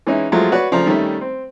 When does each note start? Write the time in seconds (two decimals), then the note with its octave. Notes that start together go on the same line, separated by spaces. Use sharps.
0.07 E3 G#3 C#4 D#4 E4
0.32 F3 F#3 G#3 A3 E4 F4
0.52 F#4 B4 C#5 D5
0.72 C#3 F3 A3 D5 A#5
0.86 D#3 G3 A3 C#4 E5
1.21 C4